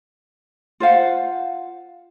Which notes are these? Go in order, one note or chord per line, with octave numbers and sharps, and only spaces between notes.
F4 C5 F5 F#5